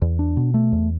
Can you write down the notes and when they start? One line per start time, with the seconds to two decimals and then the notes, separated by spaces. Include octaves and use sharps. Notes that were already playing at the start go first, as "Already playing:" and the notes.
0.02 E2
0.19 D4
0.37 B2
0.54 A3
0.72 E2